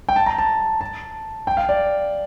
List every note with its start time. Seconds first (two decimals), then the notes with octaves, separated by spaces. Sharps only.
0.09 G5
0.16 A5
0.26 A#5
0.38 A5
0.81 A5
1.47 G5
1.57 F5
1.69 D5